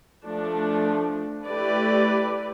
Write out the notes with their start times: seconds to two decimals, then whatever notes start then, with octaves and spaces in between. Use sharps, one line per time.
0.25 F3 A3 D4
1.46 A3 E4 G4 B4 D5